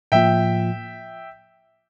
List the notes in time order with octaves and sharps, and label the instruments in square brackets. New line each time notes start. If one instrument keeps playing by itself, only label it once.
[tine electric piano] A2 F3 A#3 F4 [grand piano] E5 G5